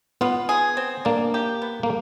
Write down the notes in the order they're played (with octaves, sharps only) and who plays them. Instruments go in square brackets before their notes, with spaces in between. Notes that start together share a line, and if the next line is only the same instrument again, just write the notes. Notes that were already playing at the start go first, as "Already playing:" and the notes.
[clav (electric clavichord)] B3 [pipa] F4
[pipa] G#4
C4
[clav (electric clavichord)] A#3 [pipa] D4
[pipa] G4
B3
[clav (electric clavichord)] A#3